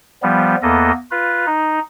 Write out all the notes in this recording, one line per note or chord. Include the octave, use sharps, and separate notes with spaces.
F3 G3 B3
E2 A#3 B3 A4 D#5
F4 B4
D#4